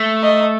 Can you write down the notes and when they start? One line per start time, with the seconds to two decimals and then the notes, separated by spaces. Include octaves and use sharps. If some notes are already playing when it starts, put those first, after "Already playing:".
Already playing: A3
0.23 D#5